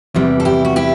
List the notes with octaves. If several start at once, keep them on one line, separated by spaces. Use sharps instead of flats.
E2 C3 E3 G3
A4
E4 G4
F#4
E4 G4